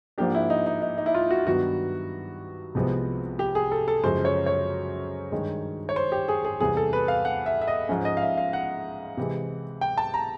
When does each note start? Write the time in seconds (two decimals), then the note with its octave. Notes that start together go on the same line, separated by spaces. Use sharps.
0.18 G#2 F3 A#3 D4 G4
0.35 E4
0.50 D#4
0.66 D#4
0.82 D#4
0.98 D#4
1.06 E4
1.14 F4
1.31 F#4
1.46 G2 D#3 F#3 B3 F#4
2.75 C2 C3 F3 G#3 B3
3.39 G4
3.55 G#4
3.72 A4
3.88 A4
4.03 F#2 C#3 F3 G#3 C5
4.25 C#5
4.46 C#5
5.32 G2 D#3 G#3
5.89 C#5
5.96 C5
6.12 G4
6.28 G#4
6.45 G#4
6.60 E2 C3 E3 G3 G#4
6.77 A4
6.93 B4
7.08 F5
7.25 F#5
7.46 E5
7.61 E5
7.67 D#5
7.89 G#2 F3 G#3 C#4
8.05 D#5
8.17 F5
8.22 E5
8.37 F5
8.53 F#5
9.17 C3 E3 G#3
9.81 G5
9.98 A5
10.14 A#5